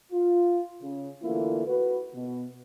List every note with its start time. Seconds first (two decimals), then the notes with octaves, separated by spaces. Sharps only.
0.13 F4
0.82 C#3
1.23 D3 E3 A3 A#3 E4 F4
1.67 F#4 B4
2.14 B2